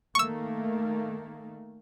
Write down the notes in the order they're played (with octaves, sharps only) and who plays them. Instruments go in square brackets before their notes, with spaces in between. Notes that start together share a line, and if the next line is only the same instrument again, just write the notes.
[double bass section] D#3 A3 A#3 [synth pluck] C#6 E6